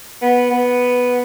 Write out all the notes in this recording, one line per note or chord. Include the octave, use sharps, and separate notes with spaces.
B3
B3